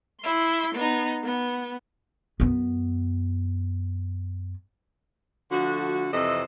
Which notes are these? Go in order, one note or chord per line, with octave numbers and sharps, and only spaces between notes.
E4 C6
B3 D#4
B3
F#2 B3
D3 F3 A3 F#4
F2 C3 E3 A4 C5 D#5